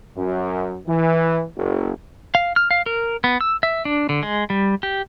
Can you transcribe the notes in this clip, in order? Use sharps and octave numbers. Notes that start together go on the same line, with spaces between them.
F#2
E3
F#1
F5
F6
F5
A#4
B3
E6
E5
D4
D3
G#3
G3
G4